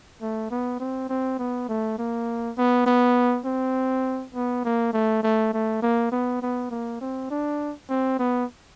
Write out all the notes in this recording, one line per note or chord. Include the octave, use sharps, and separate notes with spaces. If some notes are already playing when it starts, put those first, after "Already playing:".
A3
B3
C4
C4
B3
A3
A#3
B3
B3
C4
B3
A#3
A3
A3
A3
A#3
B3
B3
A#3
C4
D4
C4
B3